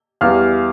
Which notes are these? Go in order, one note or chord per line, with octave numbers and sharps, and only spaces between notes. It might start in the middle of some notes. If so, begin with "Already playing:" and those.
E2 E3 G3 F5 F6